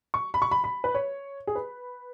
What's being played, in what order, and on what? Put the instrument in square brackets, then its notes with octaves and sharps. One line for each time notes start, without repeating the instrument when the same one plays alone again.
[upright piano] C#6
B5
C#6
B5
B5
B4
C#5
G#4
B4